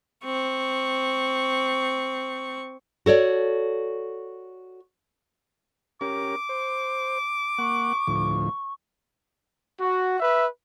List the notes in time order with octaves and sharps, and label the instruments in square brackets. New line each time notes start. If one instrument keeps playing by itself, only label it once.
[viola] C4 C#6
[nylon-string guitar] F#4 A4 C#5 D5
[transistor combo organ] C#4 G4 A#4 [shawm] D6
[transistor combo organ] C5
[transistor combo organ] A#3 F#5 [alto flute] C#6
[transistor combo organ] D2 A2 F3
[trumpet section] F#4
B4 E5